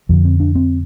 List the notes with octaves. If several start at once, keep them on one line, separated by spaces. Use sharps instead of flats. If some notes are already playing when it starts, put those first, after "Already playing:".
F2 D3 F3
C4
D4
C4